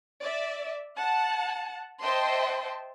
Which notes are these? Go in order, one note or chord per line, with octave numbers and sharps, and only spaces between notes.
D5 E5
F#5 A5
C5 D#5 E5 G5 A5 C6